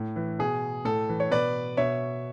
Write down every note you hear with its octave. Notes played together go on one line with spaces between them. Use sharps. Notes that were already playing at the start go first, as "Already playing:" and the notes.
Already playing: A2
E3
B2 G#4
A2 A4
E3
C#5
B2 B4 D5
B2 C#5 E5